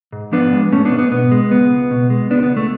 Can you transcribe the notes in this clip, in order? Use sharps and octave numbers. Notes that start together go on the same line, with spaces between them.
G#2
F3 B3 D4
G#3
G#2 A3 C#4
B3 D4
G#2
B3
B2 B3
G#3
C#2 B3
C#2
B2
G#3
C#2 B3 D4
B3
C#2
A3